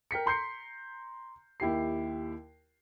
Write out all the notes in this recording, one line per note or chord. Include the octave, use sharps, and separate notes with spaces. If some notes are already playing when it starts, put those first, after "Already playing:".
A#4 G5 B6 C#7
A#5 C6 G6 C7 C#7
D#2 E4 G4 C7